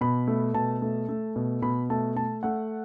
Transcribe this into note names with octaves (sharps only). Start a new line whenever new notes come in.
B2 B5
A3
B2 A5
A3
A3
B2
B2 B5
A3 A5
A3 A5
A3 F#5